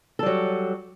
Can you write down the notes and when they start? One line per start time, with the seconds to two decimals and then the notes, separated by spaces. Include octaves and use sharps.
0.19 A4
0.23 G3
0.26 F#3